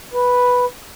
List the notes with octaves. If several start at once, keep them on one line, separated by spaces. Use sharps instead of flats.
B4